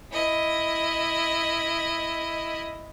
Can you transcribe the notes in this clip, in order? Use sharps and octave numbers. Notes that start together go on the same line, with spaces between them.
E4 D#5